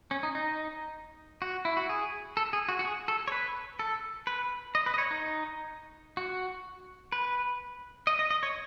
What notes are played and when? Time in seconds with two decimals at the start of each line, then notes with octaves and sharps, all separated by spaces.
0.11 C#4
0.23 D#4
0.35 D#4
1.42 F#4
1.65 E4
1.77 F#4
1.89 G#4
2.37 A4
2.53 G#4
2.69 F#4
2.79 F#4
2.85 G#4
3.08 A4
3.28 C#5
3.32 B4
3.79 A4
4.27 B4
4.75 D#5
4.86 B4
4.94 D#5
4.98 C#5
5.11 D#4
6.17 F#4
7.12 B4
8.07 D#5
8.19 D#5
8.30 D#5
8.43 C#5